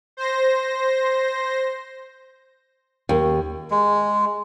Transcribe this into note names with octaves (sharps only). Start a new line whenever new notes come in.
C5 A#6
D#2
G#3